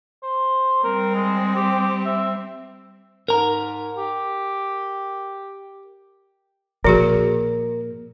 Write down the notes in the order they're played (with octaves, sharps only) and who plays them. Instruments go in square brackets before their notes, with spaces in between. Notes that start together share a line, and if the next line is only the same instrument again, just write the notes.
[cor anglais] C5
[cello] G3 C4 [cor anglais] A#4
[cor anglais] G#3
G4
E5
[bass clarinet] G#2 [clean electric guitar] A#4 A#5
[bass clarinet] G4
[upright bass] A#2 [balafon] F3 F#4 G#4 [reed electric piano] A#4